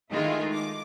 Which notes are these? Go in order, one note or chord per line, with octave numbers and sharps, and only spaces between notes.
D#3 G#3 A3 E4 F4 G#4
D6